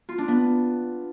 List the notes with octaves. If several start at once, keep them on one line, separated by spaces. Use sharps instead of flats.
F4
D4
B3